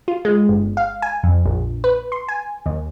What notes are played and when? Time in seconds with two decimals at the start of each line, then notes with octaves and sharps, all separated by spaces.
0.08 F4
0.25 G#3
0.49 G1
0.77 F5
1.02 G#5
1.23 F2
1.46 A#1
1.84 B4
2.12 C6
2.29 G#5
2.66 D#2